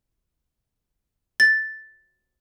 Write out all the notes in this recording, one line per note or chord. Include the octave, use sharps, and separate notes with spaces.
A6